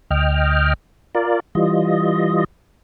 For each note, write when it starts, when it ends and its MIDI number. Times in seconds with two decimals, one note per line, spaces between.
0.11 0.73 38
0.11 0.73 75
0.11 0.73 79
0.11 0.73 89
1.15 1.40 65
1.15 1.40 70
1.15 1.40 74
1.55 2.44 52
1.55 2.44 55
1.55 2.44 65
1.55 2.44 75